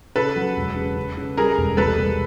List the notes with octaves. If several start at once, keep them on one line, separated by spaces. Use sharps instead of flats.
C#3 A4 B4
F#3
E1
C#3
C#3
C#3
G3 G#4 A#4
E1
C2 A4 B4
C2